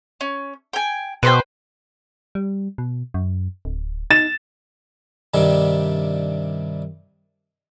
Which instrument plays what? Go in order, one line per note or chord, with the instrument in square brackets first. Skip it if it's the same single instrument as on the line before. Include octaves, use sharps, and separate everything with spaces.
[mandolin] C#4
G5 G#5
[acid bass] B2 [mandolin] B4 C5 G5
[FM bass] G3
B2
F#2
D1
[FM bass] D#4 [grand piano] A6 E7
[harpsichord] G2 C3 D#3 G3 D4